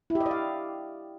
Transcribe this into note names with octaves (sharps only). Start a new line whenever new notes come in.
E4
G4
D#5
D5
F5